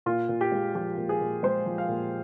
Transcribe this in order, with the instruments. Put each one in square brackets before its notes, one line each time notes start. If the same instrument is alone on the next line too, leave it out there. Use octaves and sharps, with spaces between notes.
[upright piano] A#2 F4
A#2
G4
G#3
F3 G4
A#2
G#4
A#2
G#3 C5
F3
F5
A#2